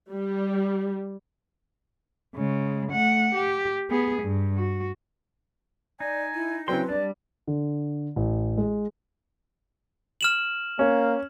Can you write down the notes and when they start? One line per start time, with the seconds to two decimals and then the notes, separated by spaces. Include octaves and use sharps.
0.12 G3
2.36 C#3 G#3
2.92 A3 F#5
3.35 G4
3.90 B3 G#4
4.23 G2
4.56 F#4
6.00 D#4 D5 G#5
6.35 E4
6.68 C#3 F#3 C4 E4 B4 G5 C6
6.89 G3 D4 D5 A5
7.47 D3
8.16 A1
8.57 G#3
10.21 F6 E7 F#7
10.79 A#3 C#4